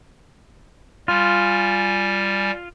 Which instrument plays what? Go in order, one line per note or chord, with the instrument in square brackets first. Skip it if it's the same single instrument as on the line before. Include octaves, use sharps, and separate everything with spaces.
[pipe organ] G3 G#5 [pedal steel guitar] F4